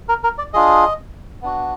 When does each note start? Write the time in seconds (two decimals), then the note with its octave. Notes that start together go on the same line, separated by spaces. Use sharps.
0.09 A#4
0.24 A#4
0.38 D5
0.53 D4 F4 G#4 D#5
1.42 B3 D4 F#4